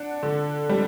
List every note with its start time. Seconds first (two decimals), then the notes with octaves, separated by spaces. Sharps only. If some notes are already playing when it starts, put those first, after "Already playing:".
Already playing: D4 F#5
0.23 D3
0.69 G3